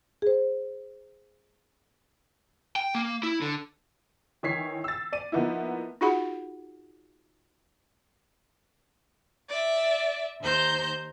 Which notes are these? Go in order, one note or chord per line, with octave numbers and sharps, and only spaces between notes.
G#4 C5
G5
A#3
E4
D3
D#3 E3 C#5 B6 C7
E6 A6
D5 D#7
F3 A#3 B3 D#4 E4
D#4 F4 F#4 G#4 F#5 B5
D5 E5
D#2 C5 A#5 G6